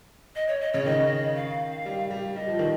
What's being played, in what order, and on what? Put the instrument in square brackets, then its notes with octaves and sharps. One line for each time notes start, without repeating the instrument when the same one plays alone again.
[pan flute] D#5
C#5
D#5
[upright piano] C#3 [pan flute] C#5
[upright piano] D#3 [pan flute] D#5
[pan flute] F5
[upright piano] G3
G3
[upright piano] G3 [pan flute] D#5
[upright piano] F3
D#3